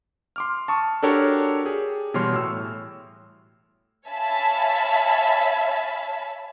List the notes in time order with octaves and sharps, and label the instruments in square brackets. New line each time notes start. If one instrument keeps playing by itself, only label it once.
[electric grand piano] C6 D6 F6
A5 C#6 D#6
D4 F#4 G4 A4 A#4 C#5
G4 G#4
B2 E3 G3 C#5 C6 F6
A2 E6
[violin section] C#5 E5 F5 G#5 A5 B5